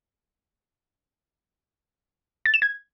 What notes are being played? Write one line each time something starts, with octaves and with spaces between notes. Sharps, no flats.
A6
E7
G#6